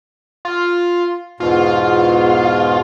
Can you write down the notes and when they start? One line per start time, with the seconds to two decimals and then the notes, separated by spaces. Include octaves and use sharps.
0.45 F4
1.40 E2 G#2 B2 F4